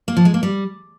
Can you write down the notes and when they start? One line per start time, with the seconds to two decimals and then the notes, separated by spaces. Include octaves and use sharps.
0.08 A#3
0.17 F3
0.25 G#3
0.34 A#3
0.43 G3